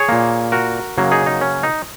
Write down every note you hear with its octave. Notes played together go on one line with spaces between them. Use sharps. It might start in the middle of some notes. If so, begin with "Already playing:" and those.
Already playing: G#4 C#5
A#2 A#3
F#4 A#4
F#2 C#3 F#3 A#3
D#4 G#4
D#4
C#4
D#4